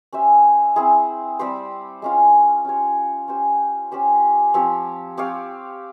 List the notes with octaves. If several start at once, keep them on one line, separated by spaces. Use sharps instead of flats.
C#4 G4 C5 E5
C4 E4 G#4
G3 C4 G4 C5
G#3 C#4 F4
C#4 G4 C#5
C#4 G4 C5
C#4 G4 C5
F3 C4 G4 C#5
C4 G4 C#5 F5